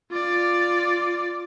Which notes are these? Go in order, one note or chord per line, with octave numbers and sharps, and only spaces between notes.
F4 D5